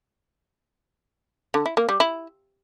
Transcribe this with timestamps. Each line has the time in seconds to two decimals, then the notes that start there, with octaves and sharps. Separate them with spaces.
1.54 D3
1.66 E4
1.77 A#3
1.89 G3
2.00 E4